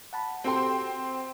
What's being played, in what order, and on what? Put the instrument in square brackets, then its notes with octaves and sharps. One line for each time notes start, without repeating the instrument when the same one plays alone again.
[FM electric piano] F#5 A5 B5
[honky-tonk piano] C4 G5 C6 [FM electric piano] F#4 G4 A4